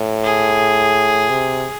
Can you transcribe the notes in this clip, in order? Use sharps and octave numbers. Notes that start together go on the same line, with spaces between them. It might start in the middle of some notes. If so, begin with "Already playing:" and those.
Already playing: A2
G#4
C3